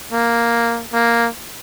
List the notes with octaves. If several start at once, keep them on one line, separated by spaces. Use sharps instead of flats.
A#3
A#3